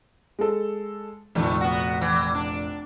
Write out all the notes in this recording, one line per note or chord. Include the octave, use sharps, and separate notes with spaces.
G#3 A4
F1 A#1 D#3 A3
B3 F#4
E3
D4